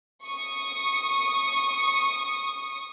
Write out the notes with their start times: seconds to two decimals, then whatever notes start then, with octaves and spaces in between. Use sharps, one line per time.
0.24 C#6 D#6